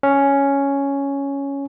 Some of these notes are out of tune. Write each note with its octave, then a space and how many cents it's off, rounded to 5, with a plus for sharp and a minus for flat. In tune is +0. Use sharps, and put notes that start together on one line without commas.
C#4 +5